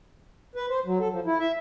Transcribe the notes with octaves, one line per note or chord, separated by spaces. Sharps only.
B4
C5
F#3
A4
F3
E4
E5